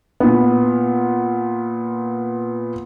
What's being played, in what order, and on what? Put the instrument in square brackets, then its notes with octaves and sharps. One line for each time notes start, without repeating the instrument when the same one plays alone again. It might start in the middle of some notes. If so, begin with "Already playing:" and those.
[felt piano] A#2 B3